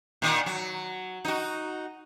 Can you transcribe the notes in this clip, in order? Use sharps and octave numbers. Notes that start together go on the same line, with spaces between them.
A#2 D#3
F#3
D#4 F#4